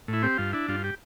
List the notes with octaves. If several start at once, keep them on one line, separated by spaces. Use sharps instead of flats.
A2 E4
C4 G4
G2 F4
D4 E4
G2 F4
G4